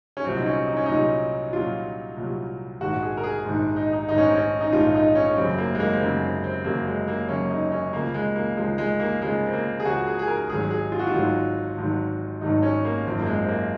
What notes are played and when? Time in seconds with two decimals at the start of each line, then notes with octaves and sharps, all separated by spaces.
0.17 C#4
0.24 C2 A#2 F#3 C4
0.37 D#4
0.46 C#4
0.67 D#4
0.77 C#4
0.86 C2 A#2 F#3 D#4
1.53 C2 A#2 F#3 F4
2.16 C2 A#2 F#3
2.80 A#1 G#2 D#3 F#4
3.02 G#4
3.17 A#4
3.23 G#4
3.45 A#1 G#2 D#3
3.76 D#4
3.93 D#4
4.09 A#1 G#2 D#3 D#4
4.18 C#4
4.26 C4
4.35 C#4
4.61 D#4
4.72 A#1 G#2 D#3 F4
4.95 D#4
5.15 C#4
5.27 C#4
5.37 F#1 F#2 C#3 F#3 C4
5.58 A#3
5.75 G#3
5.80 A#3
5.93 C4
6.00 F#1 F#2 C#3 F#3 A#3
6.23 C4
6.44 C4
6.64 F#1 F#2 C#3 F#3 A#3
6.87 G#3
7.08 A#3
7.29 F#1 F#2 C#3 F#3 C#4
7.50 D#4
7.72 C#4
7.93 C#2 C#3 F3 A#3
8.14 G#3
8.36 A#3
8.57 C#2 C#3 F3 G#3
8.78 G#3
9.00 A#3
9.21 C#2 C#3 F3 G#3
9.46 C4
9.53 A#3
9.80 G#4
9.85 C#2 C#3 F3 F#4
10.07 G#4
10.19 G#4
10.27 A#4
10.49 G#1 G#2 D#3 F#3 G#4
10.71 G#4
10.92 F4
10.99 F#4
11.07 F4
11.13 G#1 G#2 D#3 F#3
11.77 G#1 G#2 D#3 F#3
12.41 G#1 G#2 D#3 F#3 D#4
12.63 C#4
12.85 A#3
13.05 G#1 F#2 F3 C4
13.20 A#3
13.26 G#3
13.42 C4
13.48 A#3